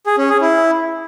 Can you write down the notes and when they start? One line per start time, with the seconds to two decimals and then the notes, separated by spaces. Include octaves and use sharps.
0.06 G#4
0.18 C#4
0.30 G#4
0.41 E4